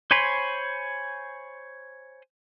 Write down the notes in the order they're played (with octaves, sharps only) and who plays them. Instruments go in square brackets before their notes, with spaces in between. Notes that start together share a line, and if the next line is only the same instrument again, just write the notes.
[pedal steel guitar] C5 C#5 G#5 B5 C6